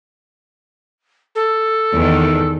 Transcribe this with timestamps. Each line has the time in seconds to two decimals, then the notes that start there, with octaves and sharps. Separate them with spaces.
1.35 A4
1.92 E2 D#3